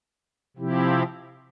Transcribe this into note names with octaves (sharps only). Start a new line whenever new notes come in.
C3 F3 C4 E4 G4